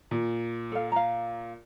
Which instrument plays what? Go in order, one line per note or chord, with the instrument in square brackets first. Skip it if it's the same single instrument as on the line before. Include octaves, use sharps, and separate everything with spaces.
[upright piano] A#2
[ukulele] A4 F5
F5 A#5